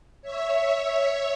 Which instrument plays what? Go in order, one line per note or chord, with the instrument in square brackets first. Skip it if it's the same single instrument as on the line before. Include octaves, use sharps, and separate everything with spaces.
[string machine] C#5 E5